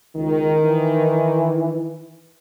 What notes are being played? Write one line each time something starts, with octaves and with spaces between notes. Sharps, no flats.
C#2 D#3
E3